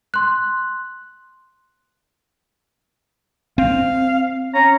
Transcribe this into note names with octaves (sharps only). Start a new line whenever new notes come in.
C6 F#6
C4 F5
C#4 A#5